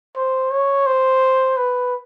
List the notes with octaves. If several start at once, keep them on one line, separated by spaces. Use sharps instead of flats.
C5
C#5
C5
B4